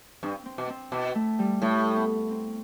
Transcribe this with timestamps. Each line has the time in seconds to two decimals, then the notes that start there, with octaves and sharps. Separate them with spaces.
0.23 G2 C4
0.46 C4
0.58 B2
0.70 C4
0.92 B2 E4
1.15 A3
1.39 G3
1.62 A2 A3
1.96 B3
2.31 C4